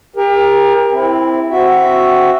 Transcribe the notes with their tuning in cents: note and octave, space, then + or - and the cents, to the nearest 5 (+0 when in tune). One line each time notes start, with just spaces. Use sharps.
G4 +40 A#4 +20
C4 +0 E4 +0
C4 +0 F#4 +0 E5 +0